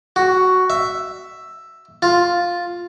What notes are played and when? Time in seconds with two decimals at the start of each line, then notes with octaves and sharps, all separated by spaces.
0.16 F#4
0.70 E5
2.02 F4